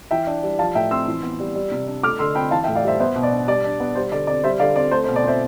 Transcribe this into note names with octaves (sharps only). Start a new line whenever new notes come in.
E3 E5 G5
D4
G3
F3 F5 A5
A2 E5 G5
C4 C6 E6
E3
B3
G3
G3
C3
D4
A3 D6 F6
D3 C6 E6
C4 G5 B5
E3 F5 A5
E5 G5
A2
D5 F5
G3 C5 E5
B3 C5 E5
B2
D5
D4
G3 D5
D4
B3
G3 C5
D3 D5
C4 D5
G3 C5 E5
D3 D5 F5
C4 D5
A3 C5
C5
B2
D5
C4 C5 E5